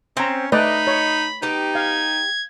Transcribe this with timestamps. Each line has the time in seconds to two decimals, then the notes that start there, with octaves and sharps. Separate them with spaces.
0.17 C4 C#4 C5 A#5
0.52 A3 D#4 B4 D5 D#5 B5
0.87 C#5
1.42 B3 D#4 G4
1.75 F5 G#6